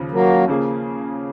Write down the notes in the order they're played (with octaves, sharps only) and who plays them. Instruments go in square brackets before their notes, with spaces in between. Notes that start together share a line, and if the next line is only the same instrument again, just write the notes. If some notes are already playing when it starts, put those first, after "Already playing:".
Already playing: [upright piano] D#2 C#3 F3
[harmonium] F#3 A#3
[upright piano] C#3 F3 A#3 C#4 G#4